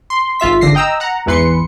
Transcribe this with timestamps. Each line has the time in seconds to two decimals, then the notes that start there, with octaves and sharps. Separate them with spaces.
0.10 C6
0.40 G#1 F4 E5 B6
0.61 G#1 D3 A#6 C7
0.75 D#5 G5 A#5 E6
1.00 F#5 A#5
1.26 G#1 E2 E3 B4 C6 C#7